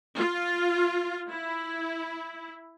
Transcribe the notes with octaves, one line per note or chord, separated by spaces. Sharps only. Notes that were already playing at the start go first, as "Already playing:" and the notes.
F4
E4